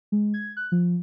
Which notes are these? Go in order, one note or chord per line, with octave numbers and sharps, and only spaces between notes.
G#3
G#6
F#6
F3